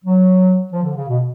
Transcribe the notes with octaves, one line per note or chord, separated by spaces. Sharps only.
F#3
F3
D3
C#3
B2